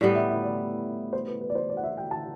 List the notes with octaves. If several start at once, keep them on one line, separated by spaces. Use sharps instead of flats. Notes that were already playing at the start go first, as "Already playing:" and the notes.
A2 G3 B3 D5
E5
E5
D5
C5
B4
B4
D5
C5
D5
F#5
E5
G5
A5